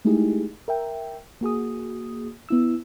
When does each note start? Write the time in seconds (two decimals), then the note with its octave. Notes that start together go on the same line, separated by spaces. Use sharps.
0.05 G#3 A3 D#4 E4 G4 G#4
0.68 A#4 E5 G5
1.41 A#3 F#4 G#4 D#6
2.49 B3 E4 E6